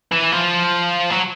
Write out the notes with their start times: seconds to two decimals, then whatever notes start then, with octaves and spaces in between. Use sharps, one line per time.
0.12 E3
0.32 F3
1.11 F#3